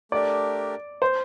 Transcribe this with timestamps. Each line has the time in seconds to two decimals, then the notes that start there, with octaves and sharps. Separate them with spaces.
0.12 A3 D4 G4 A#4 D5
1.02 C5